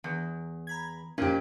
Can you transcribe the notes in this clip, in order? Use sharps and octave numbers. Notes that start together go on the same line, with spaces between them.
E2
A#5 B5 G#6
F2 A#2 C#4 G4